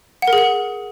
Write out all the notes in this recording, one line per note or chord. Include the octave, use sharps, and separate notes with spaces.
F#5
A#4
G#4
F#5